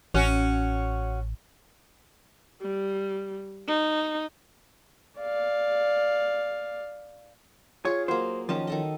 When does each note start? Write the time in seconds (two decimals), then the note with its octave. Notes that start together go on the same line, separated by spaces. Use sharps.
0.14 A1 C#4 F#4
2.61 G3
3.67 D#4
5.20 D5 F5
7.85 F4 G#4 C#5
8.08 F#3 A#3 C5
8.49 D#3 F3 C#4 D#5 A5
8.67 D#3 A4 D#5